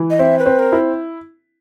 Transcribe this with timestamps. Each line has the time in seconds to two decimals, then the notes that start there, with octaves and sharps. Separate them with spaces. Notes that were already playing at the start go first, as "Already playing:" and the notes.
Already playing: E3
0.10 D#5
0.19 C4 E5
0.39 B4
0.46 C4
0.59 A#4
0.72 E4